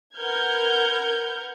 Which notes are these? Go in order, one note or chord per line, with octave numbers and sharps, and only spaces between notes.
A#4 B4 F#5 F6 G6 G#6